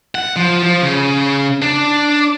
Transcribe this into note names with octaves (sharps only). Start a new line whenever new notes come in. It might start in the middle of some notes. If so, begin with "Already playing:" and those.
F#5
F3
F3
C#3
D4